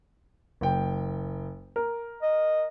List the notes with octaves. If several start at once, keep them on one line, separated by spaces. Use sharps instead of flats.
F#1 G5
A#4
D#5